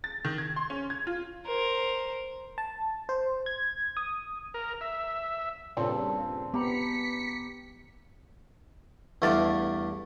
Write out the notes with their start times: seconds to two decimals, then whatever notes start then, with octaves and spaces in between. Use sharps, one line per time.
0.04 A6
0.25 D#3
0.38 G#6
0.56 C6
0.70 C#4
0.90 G#6
1.07 F4
1.46 A#4 C5
2.58 A5
3.09 C5
3.46 G#6
3.97 D#6
4.54 A#4
4.81 E5
5.77 G2 A#2 C#3 C4 A4
6.54 B3 G4 A#5 B5 B6 C#7
9.22 E2 G2 A3 D5 F5